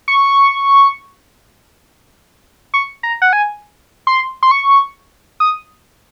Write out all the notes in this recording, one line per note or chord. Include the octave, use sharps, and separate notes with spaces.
C#6
C#6
A#5
F#5
G#5
C6
C6
C#6
D#6